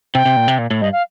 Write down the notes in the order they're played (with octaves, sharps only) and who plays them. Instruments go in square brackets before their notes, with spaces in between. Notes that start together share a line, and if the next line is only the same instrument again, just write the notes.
[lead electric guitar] C3 [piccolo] G5
[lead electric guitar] C3
A#2
C3
A#2
A2
[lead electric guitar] G2 [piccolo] D#5
[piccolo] F5